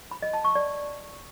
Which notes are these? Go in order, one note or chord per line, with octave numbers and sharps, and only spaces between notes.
B5
D#5
A5
C#6
D5